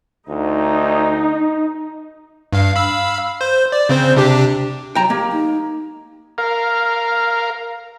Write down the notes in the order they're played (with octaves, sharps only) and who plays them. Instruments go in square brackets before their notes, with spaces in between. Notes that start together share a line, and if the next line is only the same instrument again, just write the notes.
[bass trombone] D2 [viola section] D#4
[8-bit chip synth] G2 F5
F5 B5 E6
C5
D5
C#3 C4 C5
C3 D4 G4
[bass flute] F#3 [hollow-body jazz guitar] G5 A#5
[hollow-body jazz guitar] A#3 [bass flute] G4
[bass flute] D#4
[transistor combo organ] A#4 F5